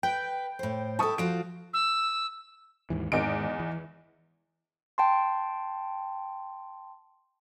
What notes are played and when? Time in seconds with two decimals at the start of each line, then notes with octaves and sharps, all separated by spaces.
0.03 B4 G5
0.59 A2 C5
0.99 E4 A4 A5 C#6 D#6
1.18 F3 F4 F#4 D7
1.74 E6
2.90 D#2 G#2 E3
3.12 E2 G#2 D#3 D#5 D7
3.60 E3
4.98 G5 A5 C6